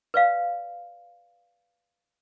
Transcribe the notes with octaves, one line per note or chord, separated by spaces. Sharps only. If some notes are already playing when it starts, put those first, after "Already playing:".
B4 D5 F5